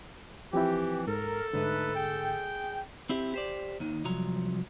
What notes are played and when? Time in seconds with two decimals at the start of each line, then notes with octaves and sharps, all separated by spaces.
0.53 E3 F3 C4 E4 G4
1.07 G#2 A4 A#4
1.53 G#2 D3 A3 D#4 B4
1.96 G#4 G5
3.09 C4 E4 G4
3.34 G4 C5 D5
3.80 D#2 D#3
4.05 C2 F3 F#3 A#5